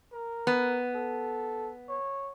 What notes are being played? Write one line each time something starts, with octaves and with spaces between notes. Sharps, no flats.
A#4
B3
A4
C#5